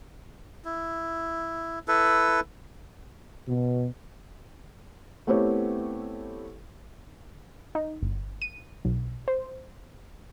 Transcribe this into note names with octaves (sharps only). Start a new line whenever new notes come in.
E4
E4 A4 B4
B2
A3 B3 C4 E4 G4 C#5
D#4
G1
D#7
B1
C5